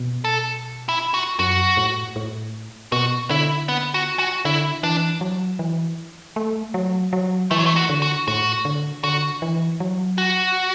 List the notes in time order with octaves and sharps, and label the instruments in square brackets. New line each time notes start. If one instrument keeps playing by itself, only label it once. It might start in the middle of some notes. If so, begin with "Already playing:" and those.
Already playing: [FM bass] B2
[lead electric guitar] A4
E4
F#4
[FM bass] F#2 [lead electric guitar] F#4
[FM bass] A2
A2
[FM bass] B2 [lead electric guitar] F#4
[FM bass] D3 [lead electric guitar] E4
[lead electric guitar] B3
F#4
F#4
[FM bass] D3 [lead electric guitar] E4
[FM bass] E3 [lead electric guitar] D4
[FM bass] F#3
E3
A3
F#3
F#3
[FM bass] E3 [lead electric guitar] A3
[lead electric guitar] F#3
A3
F#4
[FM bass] D3
[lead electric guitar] F#4
[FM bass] A2 [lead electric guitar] F#4
[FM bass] D3
[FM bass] D3 [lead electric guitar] F#4
[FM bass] E3
F#3
[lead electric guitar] F#4